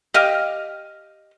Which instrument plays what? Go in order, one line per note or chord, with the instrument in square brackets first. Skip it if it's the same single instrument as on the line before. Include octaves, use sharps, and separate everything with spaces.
[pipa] G4 D#5 F5